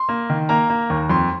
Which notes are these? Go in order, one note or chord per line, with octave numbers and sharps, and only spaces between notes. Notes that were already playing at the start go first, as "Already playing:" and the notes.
Already playing: C6
A#3
D#3
A#3 A#5
A#3
D#2
F2 C6